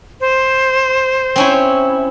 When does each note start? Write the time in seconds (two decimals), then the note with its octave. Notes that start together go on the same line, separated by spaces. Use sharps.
0.21 C5
1.36 C4 C#4 E4